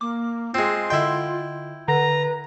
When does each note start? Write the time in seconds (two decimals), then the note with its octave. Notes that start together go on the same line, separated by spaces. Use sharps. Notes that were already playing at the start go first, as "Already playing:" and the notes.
0.01 A#3 D6
0.54 G#3 C4 F4
0.90 D3 E4 D#5 G5 C6
1.88 D3 B4 A#5